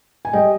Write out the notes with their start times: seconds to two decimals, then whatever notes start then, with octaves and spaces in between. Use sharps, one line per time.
0.25 G#5
0.33 G3 D#5 G5